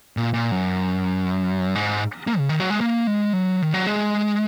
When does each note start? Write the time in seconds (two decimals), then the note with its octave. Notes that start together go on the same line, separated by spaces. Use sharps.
0.17 A#2
0.34 A#2
0.51 F#2
1.75 G#2
2.27 A#3
2.38 C#3
2.49 D#3
2.60 F#3
2.70 G#3
2.81 A#3
3.07 G#3
3.33 F#3
3.62 D#3
3.74 F#3
3.86 G#3